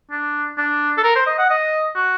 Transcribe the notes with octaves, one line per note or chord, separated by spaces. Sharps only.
D4
D4
A4
A#4
C5
D#5
F#5
D#5
F#4